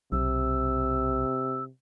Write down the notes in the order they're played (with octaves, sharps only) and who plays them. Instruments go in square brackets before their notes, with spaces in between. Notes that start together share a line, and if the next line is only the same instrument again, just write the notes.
[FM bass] B1 [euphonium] C3 [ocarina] E6